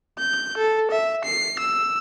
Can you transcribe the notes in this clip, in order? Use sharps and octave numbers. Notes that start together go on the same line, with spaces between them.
G6
A4
E5
C7
E6